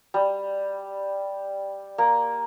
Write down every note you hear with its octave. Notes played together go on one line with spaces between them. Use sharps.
G3
A#3